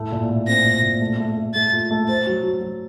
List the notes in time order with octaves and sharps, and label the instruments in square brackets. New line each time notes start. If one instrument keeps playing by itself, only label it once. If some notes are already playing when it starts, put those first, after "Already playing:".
Already playing: [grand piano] A2 A3
A#2
A3
[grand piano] C4 [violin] A#6
[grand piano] A#2
A#2
A3
A3
A3
[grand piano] A3 [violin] A6
[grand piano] F4
A3
[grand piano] C5 [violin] A6
[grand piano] F#3
F#3
F#3